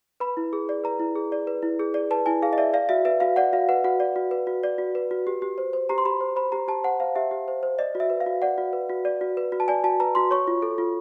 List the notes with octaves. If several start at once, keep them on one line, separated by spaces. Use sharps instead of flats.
B4 B5
E4
G#4
D5
B4 A#5
E4
G#4
D5
B4
E4
G#4
D5
B4 A5
E4 G#5
G#4 F5
D#5
D5 E5
D5 F5
F#4 E5
B4 E5
F#4 F5
D5 F#5
F#4 F5
B4 F#5
F#4 F#5
D5
F#4
B4
F#4
D5
F#4
B4
F#4
G4
G4
C5
C5
G4 A#5
C6
G4 B5
C5
C5 B5
G4 A#5
G4 A5
C5 F#5
C5 F5
G4 E5
G4
C5
C5
D5 D#5
F#4
E5
B4
F5
F#4
D5 F#5
F#4
B4
F#4
D5
F#4
B4
F#4
A5
D5 G#5
F#4 A5
B4 A#5
F#4 C6
C#5 C#6
F4
A4
F4